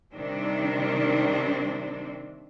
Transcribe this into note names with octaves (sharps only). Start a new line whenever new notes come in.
C3 D#3 G3 C4 D4